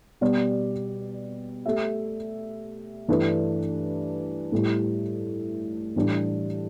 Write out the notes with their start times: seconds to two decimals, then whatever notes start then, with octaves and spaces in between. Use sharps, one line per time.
0.21 B2 G3 B3 G4 D5
1.66 A3 G4 E5
3.08 G2 E3 A3 D4 B4
4.52 A2 G3 E4
5.96 A2 E3 G3 D4 G4